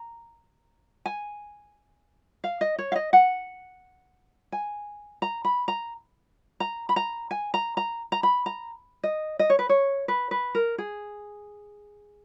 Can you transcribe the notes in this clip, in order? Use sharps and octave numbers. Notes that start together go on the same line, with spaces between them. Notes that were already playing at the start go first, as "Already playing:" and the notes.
Already playing: A#5
G#5
F5
D#5
C#5
F5
D#5
F#5
G#5
A#5
B5
A#5
A#5
B5
A#5
G#5
A#5
A#5
A#5
B5
A#5
D#5
D#5
C#5
B4
C#5
B4
B4
A#4
G#4